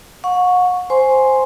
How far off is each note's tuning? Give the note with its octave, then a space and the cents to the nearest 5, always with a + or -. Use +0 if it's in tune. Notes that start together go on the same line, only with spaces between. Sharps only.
F#5 -40 C#6 +0
C5 +0 G#5 +0 C6 +0